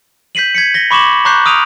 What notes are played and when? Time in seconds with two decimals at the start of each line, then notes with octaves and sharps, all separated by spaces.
0.35 G6 B6 C7 D#7 F#7
0.55 G#6 B6 C#7
0.74 A#6 G7
0.91 B5 C#6 D6 E7 F#7
1.25 A#5 C#6 D6 F#6 G6 C7
1.46 D#6 F6 D7 D#7 F7